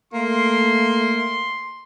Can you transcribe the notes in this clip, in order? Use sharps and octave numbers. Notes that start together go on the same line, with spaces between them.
A3 A#3 C6